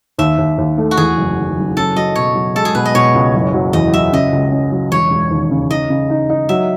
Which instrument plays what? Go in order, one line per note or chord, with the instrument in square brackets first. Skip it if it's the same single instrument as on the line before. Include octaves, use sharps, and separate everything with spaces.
[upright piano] D#2 [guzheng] E5
[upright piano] D#2
D#2
A3
[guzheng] F#4
[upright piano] E2 [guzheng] G#4
[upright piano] F#1
D#3
F#1
[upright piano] C#4 [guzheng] A4
[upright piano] F#3 [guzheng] D#5
[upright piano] B2 [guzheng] C#5
[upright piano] F#3
[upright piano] G#3 [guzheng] A4
[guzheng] G#4
[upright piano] B2 [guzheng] B4
[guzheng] D#5
[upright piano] B2 [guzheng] C#5
[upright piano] C#2
F#1
F#3
[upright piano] E2 [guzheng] D#5
[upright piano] F#3 [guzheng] E5
[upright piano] C#3 [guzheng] D#5
[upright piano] C#2
C#4
F#3
[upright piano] E1 [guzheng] C#5
[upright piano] E1
D#2
C#3
[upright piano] D#4 [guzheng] D#5
[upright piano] C#3
D#4
D#4
[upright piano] F#3 [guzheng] E5